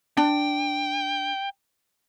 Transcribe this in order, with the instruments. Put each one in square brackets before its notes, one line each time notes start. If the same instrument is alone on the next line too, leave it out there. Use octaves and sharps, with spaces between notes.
[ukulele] D4 [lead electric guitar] G5